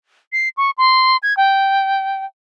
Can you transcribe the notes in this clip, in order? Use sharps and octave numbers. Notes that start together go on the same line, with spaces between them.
C7
C#6
C6
G#6
G5